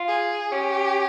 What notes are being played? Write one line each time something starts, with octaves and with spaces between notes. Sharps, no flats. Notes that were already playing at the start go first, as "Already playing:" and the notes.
Already playing: F4
G#4
C#4 G4